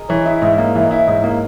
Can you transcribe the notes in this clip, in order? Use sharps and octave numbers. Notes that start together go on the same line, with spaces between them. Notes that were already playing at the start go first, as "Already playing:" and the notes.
Already playing: G#4 A#4 D#5
E3 C#5
E4 D#5
G#2 E5
A#3 D#5
E3 E5
D#5
E4 E5
G#2 D#5
A#3